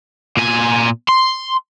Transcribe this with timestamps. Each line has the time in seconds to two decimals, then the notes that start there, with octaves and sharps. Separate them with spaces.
0.37 A#2 G#5
1.09 C6